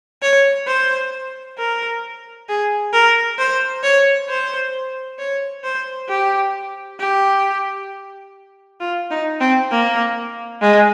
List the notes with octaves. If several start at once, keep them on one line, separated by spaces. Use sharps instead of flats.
C#5
C5
A#4
G#4
A#4
C5
C#5
C5
C#5
C5
G4
G4
F4
D#4
C4
A#3
G#3